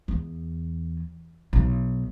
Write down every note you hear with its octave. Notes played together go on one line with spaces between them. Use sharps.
E2
B1